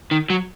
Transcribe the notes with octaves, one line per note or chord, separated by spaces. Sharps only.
D#3
F#3